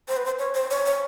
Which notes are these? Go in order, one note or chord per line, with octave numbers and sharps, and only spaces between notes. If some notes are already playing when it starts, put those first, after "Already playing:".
C5
B4
C5
C#5
C5
C#5
C#5